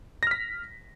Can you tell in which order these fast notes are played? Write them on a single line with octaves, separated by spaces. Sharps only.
A#6 F6 B6